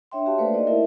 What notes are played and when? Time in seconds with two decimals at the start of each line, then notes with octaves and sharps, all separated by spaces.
0.11 D4 C#5 E5 G5 C6
0.25 F#4 G4 E5 F5 A5
0.38 A3 A#3 A4 B4 C5 D5
0.54 D#4 D5 D#5
0.67 E4 A#4 E5